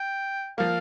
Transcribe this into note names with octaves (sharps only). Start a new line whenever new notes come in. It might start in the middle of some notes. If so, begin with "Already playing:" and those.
Already playing: G5
F3 A#3 F5